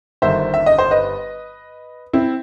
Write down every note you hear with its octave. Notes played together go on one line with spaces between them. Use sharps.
G1 G2 D#3 C5 E5
E5
D#5
C5
B4 D#5
C4 E4